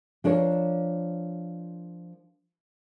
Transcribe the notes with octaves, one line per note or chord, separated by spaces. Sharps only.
F3 D4 A#4 C#5